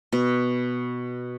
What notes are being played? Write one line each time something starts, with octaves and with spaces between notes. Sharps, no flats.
B2